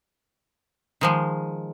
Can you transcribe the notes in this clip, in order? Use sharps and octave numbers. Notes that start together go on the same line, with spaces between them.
D#3 F3 G#3